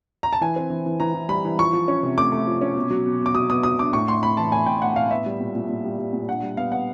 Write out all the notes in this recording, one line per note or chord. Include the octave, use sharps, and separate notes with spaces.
A#5
A5
E3 G#5
C4
E3
E3
E3 A#5
E3
G3 B5
E3
F3 C#6
F3
C#4
C3
A3 D6
A3
F3
C#4
B2
F#3
B2
B2
D6
F#3 D#6
B3 D#6
F#3 D#6
D4 D6
A2 C#6
A2 C6
A2 B5
E3 A5
A2 G#5
A2 G5
A2 F#5
A2 F5
B3 E5
G3
A#2
A#2
A#2
G3
G3
A#2
D4 F#5
G3
B3 F5
B3 F#5